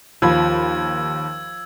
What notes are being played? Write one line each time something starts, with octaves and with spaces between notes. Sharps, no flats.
D#2 F3 B5 E6 G#6